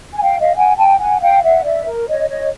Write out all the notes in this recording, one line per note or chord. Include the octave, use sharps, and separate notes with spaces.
G#5
F5 G5
D#5 F5
F#5 G#5
G5 A5
F#5 G#5
F5 G5
E5 F#5
D5 E5
A#4
C#5 D#5
C#5 D#5